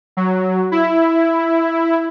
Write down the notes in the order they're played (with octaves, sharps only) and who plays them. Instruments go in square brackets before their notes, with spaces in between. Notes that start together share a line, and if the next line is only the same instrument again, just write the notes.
[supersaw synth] F#3
E4